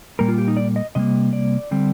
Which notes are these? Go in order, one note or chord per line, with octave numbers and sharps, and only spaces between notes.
A#2 G3 A#3 A#4
F4
G4
D#4
D5
D#5
C3 G3 A#3 D#5
D5
D3 G3 C4